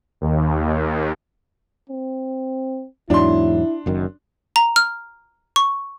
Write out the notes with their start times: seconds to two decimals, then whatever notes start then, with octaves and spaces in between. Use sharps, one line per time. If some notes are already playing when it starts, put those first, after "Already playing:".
0.21 D#2
1.90 C4
3.10 E2 G#2 F#3 D4 E4 C6
3.86 F#1 F#2 D#3
4.56 A#5
4.76 F6
5.56 C#6